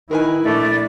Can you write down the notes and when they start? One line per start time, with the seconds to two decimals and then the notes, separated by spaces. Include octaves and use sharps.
0.11 D#3 E4 A#4 B4 G#5
0.45 A#1 A3 D5